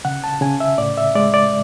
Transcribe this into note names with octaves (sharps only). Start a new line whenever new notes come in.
C#3 F#5
A5
C#3 G#5
E5
A2 D5
E5
G#3 D5
D5